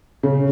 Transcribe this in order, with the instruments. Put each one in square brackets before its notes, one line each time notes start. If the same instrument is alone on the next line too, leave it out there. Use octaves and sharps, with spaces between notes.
[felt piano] C#3